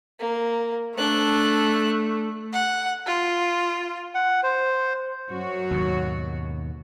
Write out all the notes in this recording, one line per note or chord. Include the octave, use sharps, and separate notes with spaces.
A#3
A3 D4 F#6
F#5
F4
F#5
C5
F#2 F#4 C#5
D#2 G#2 B2